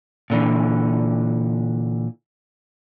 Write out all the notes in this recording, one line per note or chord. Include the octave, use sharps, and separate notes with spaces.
A#2 D3 E3